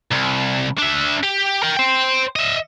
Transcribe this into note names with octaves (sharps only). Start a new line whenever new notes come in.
C2
D4 E5
G4
A#4 G5
C5 G5
D#5 E5